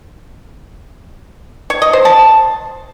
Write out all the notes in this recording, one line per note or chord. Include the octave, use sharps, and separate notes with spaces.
C#5
D#5
C5
A5